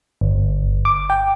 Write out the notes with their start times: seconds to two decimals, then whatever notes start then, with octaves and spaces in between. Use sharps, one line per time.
0.21 G1
0.85 D6
1.10 G5